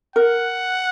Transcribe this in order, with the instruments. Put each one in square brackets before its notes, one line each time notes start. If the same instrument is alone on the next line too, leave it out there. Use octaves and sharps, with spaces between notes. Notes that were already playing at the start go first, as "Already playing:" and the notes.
[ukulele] A#4 [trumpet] F#5